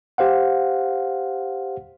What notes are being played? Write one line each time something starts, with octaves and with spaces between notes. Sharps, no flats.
G4 C5 F5 F#5